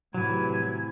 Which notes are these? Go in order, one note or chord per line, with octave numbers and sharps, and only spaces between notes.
A2 C3 E3 F#3 G#6